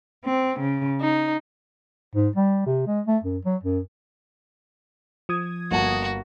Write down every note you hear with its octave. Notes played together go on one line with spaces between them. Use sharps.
C4
C#3
D#4
G#2
G3
C3
G#3
A3
F#2
F#3
F#2
F3 D#6 G#6
G1 A#3 F#4 A5